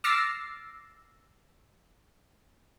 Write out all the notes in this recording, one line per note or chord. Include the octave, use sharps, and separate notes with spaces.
D6 E6 F6 A6 A#6 C7